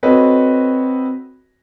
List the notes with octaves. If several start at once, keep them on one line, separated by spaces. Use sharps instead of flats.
C4 F#4 A4 B4 C#5 D#5